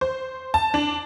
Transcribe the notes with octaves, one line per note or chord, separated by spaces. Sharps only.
C5
A5
D4